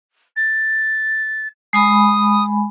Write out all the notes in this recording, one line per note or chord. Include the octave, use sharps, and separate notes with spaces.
A6
G#3 G#5 B5 D#6